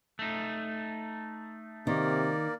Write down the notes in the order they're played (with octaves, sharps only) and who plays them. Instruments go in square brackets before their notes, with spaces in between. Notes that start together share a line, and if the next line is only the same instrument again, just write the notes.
[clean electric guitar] A3 D#4
[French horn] C3 [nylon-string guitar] D#3 [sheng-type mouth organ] A#3 A#4 D5